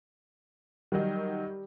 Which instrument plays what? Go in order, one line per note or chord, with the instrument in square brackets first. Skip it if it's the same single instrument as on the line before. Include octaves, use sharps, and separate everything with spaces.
[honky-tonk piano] D#3 F#3 D#4 [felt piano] G3